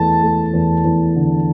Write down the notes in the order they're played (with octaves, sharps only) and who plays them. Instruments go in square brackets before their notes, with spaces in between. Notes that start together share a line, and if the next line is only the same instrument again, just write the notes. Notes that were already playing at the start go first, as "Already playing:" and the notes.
Already playing: [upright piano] E2 A3 [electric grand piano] A5
[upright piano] A3
E2
E2
D3